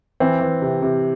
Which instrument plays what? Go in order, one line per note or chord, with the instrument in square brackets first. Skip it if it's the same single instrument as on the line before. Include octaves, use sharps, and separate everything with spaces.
[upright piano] E3 C4
E3
C3
C3